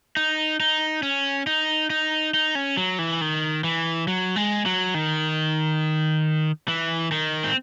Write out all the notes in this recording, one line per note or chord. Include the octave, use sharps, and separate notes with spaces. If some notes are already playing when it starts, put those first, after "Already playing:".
D#4
D#4
C#4
D#4
D#4
D#4
C#4
F#3
E3
D#3
E3
F#3
G#3
F#3
D#3
E3
D#3
C4